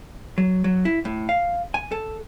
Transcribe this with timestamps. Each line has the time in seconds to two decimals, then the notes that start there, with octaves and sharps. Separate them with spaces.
0.38 F#3
0.64 F#3
0.85 E4
1.05 A2
1.29 F5
1.74 G#5
1.92 A4